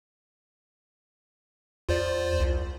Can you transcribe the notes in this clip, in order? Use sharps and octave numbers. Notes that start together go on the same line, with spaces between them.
E2 F4 C5 D5
C2